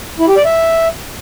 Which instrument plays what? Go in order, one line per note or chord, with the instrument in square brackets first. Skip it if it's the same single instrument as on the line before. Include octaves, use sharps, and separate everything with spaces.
[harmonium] E4
G4
D5
E5